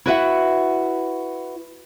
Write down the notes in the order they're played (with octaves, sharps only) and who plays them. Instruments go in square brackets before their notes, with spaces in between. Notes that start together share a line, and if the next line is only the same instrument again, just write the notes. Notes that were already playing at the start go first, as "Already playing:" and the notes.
[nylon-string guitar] E4 F#4 B4 D#5 E5 F#5